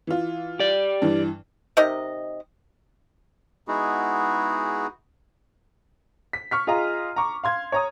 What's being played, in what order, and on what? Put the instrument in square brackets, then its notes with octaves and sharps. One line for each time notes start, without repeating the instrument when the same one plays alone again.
[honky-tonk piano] E3 F4
[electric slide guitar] G4 D5
[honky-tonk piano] G2 E3
[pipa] C3 D#4 A#4 D#5
[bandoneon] G#3 B3 D#4 E4 F#4 G#4
[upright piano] B6
C#6 F6 B6
F4 G#4 D#5 F5 A#5
A#5 C#6 D6
F5 C6 G#6
C#5 A#5 D#6